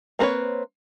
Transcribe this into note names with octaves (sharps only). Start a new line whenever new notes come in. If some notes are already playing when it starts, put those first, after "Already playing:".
A#3 C4 A#4 B4 C#5